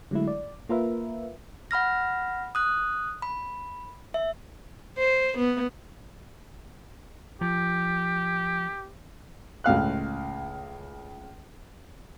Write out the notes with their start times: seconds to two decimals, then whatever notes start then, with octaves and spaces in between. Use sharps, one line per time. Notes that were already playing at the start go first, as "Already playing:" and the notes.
0.11 D3 F#3 G#3 A3 E4
0.27 D5
0.69 A#3 F4 A#4 B4 E5
1.71 F#5 B5 F6 A#6
2.55 D#6 F#6
3.22 B5
4.14 E5
4.98 C5
5.38 B3
7.41 F3 G4
9.64 C#2 A2 F5 F#6